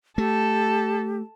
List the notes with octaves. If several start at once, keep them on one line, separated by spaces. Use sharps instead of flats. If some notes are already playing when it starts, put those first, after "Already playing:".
A3 G4 A4